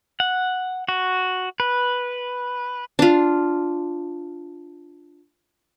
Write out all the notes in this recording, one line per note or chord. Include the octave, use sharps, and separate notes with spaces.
F#5
F#4
B4
D4 F4